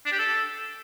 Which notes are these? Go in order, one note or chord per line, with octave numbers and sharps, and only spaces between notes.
D4
G4
A4